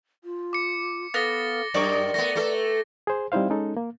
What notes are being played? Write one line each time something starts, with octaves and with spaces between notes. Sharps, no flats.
F4
D6 C#7
B3 A4 F5 A6 A#6 G7
F#2 A#4 D5 C#6 D6
A3 B3 A#6
A3 A4 B4
G#4 C5
G3 C4 D#4 E4 C5 F5
G#3 C#4 D#4 A4
A#3